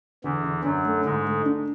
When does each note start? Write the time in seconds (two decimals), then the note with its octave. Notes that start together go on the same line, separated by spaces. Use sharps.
0.24 E2 D3 E3
0.44 D3
0.64 F#2 F#3 D4
0.85 A3
1.04 G#2 D3 G#3
1.25 A3
1.45 D4